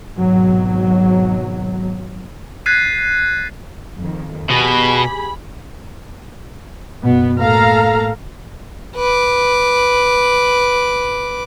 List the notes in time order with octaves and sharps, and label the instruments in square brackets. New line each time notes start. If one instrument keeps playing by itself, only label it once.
[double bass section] G#1 G#2 B2 F#3
[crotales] F#6 G#6 A6 B6 C7 D#7
[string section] F2 D#3
[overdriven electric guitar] B2 [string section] G4 G#4 B5
[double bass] F#1 B2 [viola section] B3
[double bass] A2 A#3 [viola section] A4 F5 A#5
[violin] B4 D6